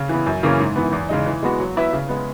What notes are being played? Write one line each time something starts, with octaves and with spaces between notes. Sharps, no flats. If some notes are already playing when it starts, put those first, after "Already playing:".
Already playing: C#3
E3 B3
F#2
C#3 E3 A#3 C#4
G#2
E3 B3
E2
C#3 G#3 D#4
E3
G#3 B3 F#4
F#3
B3 E4 B4 E5
C#3
G#3 B3